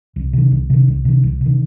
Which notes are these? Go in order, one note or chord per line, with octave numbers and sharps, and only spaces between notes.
C2
C3 D#3
C2
C3 D#3
C2
C3 D#3
C2
C3
D#3